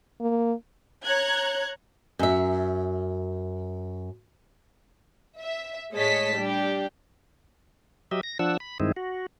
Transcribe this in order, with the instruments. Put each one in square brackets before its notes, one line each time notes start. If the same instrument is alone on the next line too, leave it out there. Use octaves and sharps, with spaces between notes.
[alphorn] A#3
[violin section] C#5 A#5 F#6 G#6
[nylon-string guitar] F#2 E5
[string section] E5
A2 G#3 C#5 D#5 A5 B6
G3 D4 G4
[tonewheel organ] F#3 G4 D#5 E5
A#6
F3 D4 F#5 E6
B5
G2 D#3 G#3 C4 D#4 E4
F#4